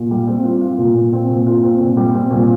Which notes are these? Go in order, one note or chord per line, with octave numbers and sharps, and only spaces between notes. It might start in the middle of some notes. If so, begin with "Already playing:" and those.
Already playing: A#2
G3
C4
F4
F4
A#2
A#2
C4
A#2
F4
C4
A#2
G3
C4
A#2